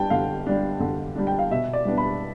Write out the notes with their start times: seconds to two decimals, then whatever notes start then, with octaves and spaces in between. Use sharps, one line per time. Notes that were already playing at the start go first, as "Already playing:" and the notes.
Already playing: G3 D4 G5 A5
0.10 D3 F5
0.47 G3 D4
0.80 D3
1.16 G3 D4
1.27 G5
1.39 F5
1.51 B2 E5
1.73 D5
1.85 G3 B3 D4
1.98 B5